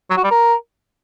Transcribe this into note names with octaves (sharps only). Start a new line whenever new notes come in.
F#3
F#4
G3
A#4